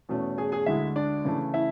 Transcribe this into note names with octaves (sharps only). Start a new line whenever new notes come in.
E2 B2 A3 C#4
G#4 G#5
G#4 G#5
D2 D3 G#3 E4 E5
D4 D5
C#3 E3 A3
E4 E5